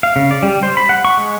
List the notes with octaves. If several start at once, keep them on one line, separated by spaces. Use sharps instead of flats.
F5
C#3
D5
G3
C5
B5
F#5
C#6
G#3